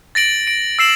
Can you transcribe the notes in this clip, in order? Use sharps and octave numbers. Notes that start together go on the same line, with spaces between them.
A6 A#6 D7 F#7
D7
E6 C7 E7 F#7